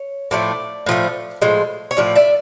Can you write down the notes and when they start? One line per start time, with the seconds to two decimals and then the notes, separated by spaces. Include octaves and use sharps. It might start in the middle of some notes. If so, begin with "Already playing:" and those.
Already playing: C#5
0.31 A2 F3 A3 D5
0.86 A2 F3 A3
1.42 A2 F3 G#3
1.91 C#5
1.97 A2 F3 D5
2.15 D5 E5